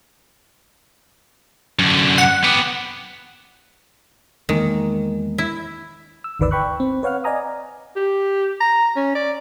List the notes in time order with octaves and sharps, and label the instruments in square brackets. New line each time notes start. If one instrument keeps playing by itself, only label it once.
[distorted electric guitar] F#2 D3
[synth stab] F#5
[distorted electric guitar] B3 G4
[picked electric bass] E2 G#3 A#3 [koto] D#3
[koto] E4
[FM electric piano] E6
G1 D2 D#3 B4 D5 E6
G5 B5 C#6 F#6
C4
B4 C#5 F5 F#5 F6
D5 D#5 G#5 A#5 D#6
[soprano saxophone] G4
A#5
C#4
D5